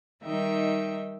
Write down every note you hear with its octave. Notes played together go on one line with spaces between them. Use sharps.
D#3 G3 D#4 E5 G5